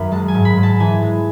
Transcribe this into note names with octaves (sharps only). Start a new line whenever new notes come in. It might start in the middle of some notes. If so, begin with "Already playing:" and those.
Already playing: F#2 D#3 E5 B5
G#3 A5
G#5
G#2
B5
G#2
A5
E3 G#5
G#3